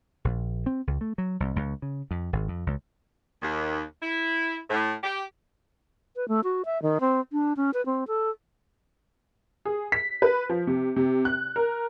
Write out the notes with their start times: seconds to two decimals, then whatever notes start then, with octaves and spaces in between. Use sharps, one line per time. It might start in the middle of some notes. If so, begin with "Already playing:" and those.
0.25 A#1
0.66 C4
0.87 C#2
1.01 A3
1.18 F#3
1.40 C2
1.56 C#2
1.82 C#3
2.11 F2
2.33 G#1
2.48 F2
2.66 C#2
3.43 D#2
4.03 E4
4.70 A2
5.04 G4
6.16 B4
6.28 A3
6.44 F#4
6.65 E5
6.82 D#3
7.01 C4
7.32 D4
7.57 C#4
7.74 B4
7.86 C4
8.08 A4
9.65 G#4
9.92 B6
10.22 B4
10.50 F3
10.67 C3
10.96 C3
11.25 F#6
11.56 A#4